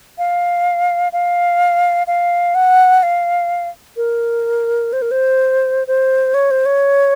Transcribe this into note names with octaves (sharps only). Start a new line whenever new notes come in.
F5
F5
F5
F#5
F5
A#4
C5
A#4
C5
C5
C#5
C5
C#5